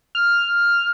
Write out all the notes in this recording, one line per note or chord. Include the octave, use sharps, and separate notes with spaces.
F6